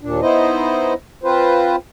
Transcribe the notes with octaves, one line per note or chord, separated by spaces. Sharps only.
D#2 A#2 D4
B3 D#4 E4 C5 D#5
C4 F4 B4 C5